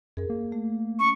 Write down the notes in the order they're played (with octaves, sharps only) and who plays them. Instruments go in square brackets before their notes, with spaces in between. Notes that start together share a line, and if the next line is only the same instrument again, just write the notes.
[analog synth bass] F#2 [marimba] G#4 A#4
[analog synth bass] A#3
[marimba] A3
[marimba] C#4 [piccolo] C#6